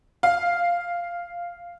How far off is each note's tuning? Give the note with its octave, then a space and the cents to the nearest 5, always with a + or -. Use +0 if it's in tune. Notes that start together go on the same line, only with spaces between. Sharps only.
F5 -5